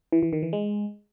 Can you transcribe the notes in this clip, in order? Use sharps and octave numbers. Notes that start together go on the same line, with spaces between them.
E3
E3
D#3
E3
G#3